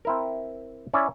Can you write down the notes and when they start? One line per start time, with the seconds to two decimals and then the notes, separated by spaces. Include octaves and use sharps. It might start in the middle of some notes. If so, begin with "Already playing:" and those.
0.05 C4 E4 A#4
0.94 C#4 E4 D5